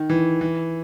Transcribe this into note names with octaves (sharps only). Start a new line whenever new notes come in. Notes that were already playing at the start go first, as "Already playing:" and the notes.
Already playing: D#3
E3
E3